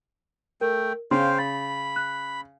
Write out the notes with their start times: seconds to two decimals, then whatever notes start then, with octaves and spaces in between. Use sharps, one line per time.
0.61 A3 A#4 G5
1.11 C#3 C5 F5 G5 C6
1.38 B5 A6
1.96 F#6